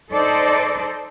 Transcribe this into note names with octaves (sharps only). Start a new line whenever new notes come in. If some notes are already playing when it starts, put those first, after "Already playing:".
D#4 A4 C5 D5